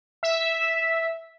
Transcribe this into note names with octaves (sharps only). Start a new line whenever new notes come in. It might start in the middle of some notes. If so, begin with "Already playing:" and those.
E5